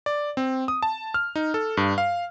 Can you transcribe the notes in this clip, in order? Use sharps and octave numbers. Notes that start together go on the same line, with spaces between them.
D5
C4
D#6
A5
F6
D#4
A4
G2
F5